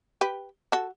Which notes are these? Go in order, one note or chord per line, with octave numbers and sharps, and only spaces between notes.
G4 B4
F#4 A4